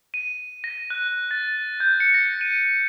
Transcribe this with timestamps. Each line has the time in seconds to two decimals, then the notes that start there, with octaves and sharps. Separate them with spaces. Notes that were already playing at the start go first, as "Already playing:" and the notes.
0.14 D#7
0.64 A#6
0.90 F#6
1.31 A6
1.80 G6
2.00 C#7
2.14 A#6
2.41 D#7